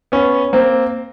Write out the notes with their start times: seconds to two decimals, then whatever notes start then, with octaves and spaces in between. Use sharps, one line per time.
0.12 B3 C#4
0.53 A#3 C4